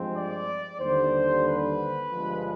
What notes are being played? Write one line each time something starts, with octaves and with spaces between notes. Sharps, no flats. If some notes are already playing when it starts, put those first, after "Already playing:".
Already playing: G2 F3 G#3 C4
D5
D#2 D3 G3 C5
B4
G1 G2 F3 G#3